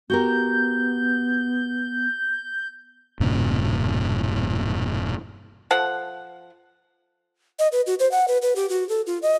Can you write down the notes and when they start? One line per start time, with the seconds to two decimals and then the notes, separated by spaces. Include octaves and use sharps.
0.10 B3 F#4 G4 A#4 G6
3.20 E1 G2 A#2 C#3
5.71 F3 A4 F#5
7.59 D#5
7.72 B4
7.87 F#4
7.99 C5
8.12 F#5
8.28 B4
8.42 B4
8.56 G4
8.69 F#4
8.89 A4
9.07 F4
9.22 D#5